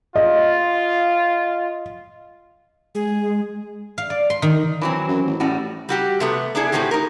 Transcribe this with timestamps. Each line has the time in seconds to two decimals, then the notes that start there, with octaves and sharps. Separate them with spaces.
0.16 F4 D#5
2.95 G#3 G#4
3.98 F5
4.10 D5
4.30 C6
4.42 D#3
4.82 E3 F#3 C4
5.08 F#2
5.27 A1
5.40 A1 A2 G3 F#4
5.89 G3 F#4 G4
6.20 C3 A3 B3
6.55 B3 D4 E4 G#4
6.72 A2 G#3 A3 C4 F#4 G4
6.91 D#4 A#4